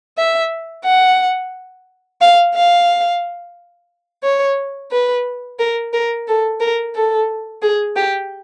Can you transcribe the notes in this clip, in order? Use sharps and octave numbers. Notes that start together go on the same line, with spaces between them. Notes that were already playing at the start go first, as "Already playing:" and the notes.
E5
F#5
F5
F5
C#5
B4
A#4
A#4
A4
A#4
A4
G#4
G4